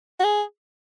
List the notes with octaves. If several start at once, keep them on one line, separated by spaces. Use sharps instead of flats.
F#4
G#4